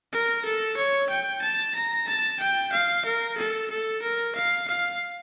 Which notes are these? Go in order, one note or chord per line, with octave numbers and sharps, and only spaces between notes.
A#4
A4
C#5
G5
A5
A#5
A5
G5
F5
A#4
A4
A4
A#4
F5
F5